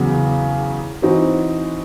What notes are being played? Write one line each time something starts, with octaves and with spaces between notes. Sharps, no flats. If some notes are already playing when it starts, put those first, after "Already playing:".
Already playing: E2 C#3 F#3
E3 C4 D#4 F#4